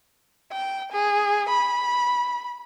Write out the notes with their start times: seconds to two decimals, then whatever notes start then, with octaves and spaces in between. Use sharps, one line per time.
0.52 G5
0.92 G#4
1.49 B5